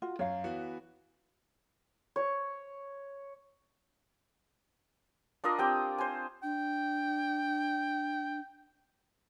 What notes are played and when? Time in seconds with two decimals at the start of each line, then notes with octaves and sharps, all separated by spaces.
0.02 F4 F#4
0.19 F#2 C#5 F5
0.44 E3 B3 F#4
2.16 C#5
5.44 D4 F4 A#4 D#5
5.59 C4 G4 G5
5.98 C5 G#5
6.43 D4 G5